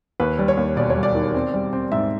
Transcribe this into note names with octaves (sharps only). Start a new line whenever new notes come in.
D#2 B4
G3
C#5
D#2
E1 D5
C#5
G3
D5
D#3
C4
G3
C4
G#2 E5